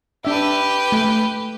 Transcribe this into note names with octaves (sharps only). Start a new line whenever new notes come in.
D4 G4 B4 E5
A3